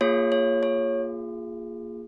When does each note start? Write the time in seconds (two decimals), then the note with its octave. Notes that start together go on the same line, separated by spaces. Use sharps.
0.01 A#3 F4 G#4 C#5
0.32 C#5
0.63 C#5